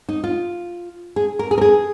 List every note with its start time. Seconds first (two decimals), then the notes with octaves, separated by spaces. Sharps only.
0.09 D#4
0.24 F4
1.16 G#4
1.39 A#4
1.51 G#4
1.58 A#4
1.61 G#4